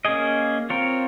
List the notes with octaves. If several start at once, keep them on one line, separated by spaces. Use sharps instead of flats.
A#3 C#4 G#4 D#5
C4 F4 A#4 C#5